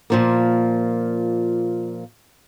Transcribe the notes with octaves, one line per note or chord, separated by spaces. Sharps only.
A#2 F3 A#3